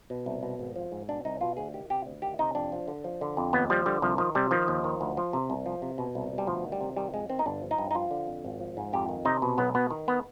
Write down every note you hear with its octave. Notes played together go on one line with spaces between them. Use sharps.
B2
C2
B2
G#1
F3
G#2
B2 D4
C2 D#4
B2 F4
D2 G#4
D#3 G4
C3 G4
D2
D#3 G4
C3 D#4
F2 D4
F3
D3
F3
D3
F2
D#2 B3
F3 G3
D3 G3
C2 F3
D#3 F3
C3 G3
D#3 F3
D#2
D#3
D2
F3
C3
C2
F3
C3
B2
C2
B2
G3
D2 F3
D#3
G3
C3
D#3 G3
F2 G#3
D#3 C4
D#4
G1 D4
F3
D#4
G2
D#4
F3 F4
D3
F2
G#1
F3
G#2
F2 G4
D#3
C3 D#4
B2
B1 B3
B2 B3
D#3
B3